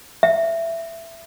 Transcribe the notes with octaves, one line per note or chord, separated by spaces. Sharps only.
E5